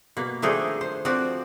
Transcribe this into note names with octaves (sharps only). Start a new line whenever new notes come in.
B2 A#3
D#3 F3 A3 D4 D#4 G#4
C5
F3 C4 F#4 D5